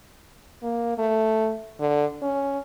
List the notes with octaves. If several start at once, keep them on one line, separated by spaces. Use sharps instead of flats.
A#3
A3
D3
C#4